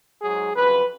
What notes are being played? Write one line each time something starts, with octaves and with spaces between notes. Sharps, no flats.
G#2 F#3 G#4
F2 C#3 F#3 B4